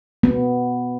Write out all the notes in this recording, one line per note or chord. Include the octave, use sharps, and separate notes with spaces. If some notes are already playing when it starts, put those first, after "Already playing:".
B3